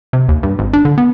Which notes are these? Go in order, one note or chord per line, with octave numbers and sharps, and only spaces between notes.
C3
D#2
G2
G#1
D4
D3
B3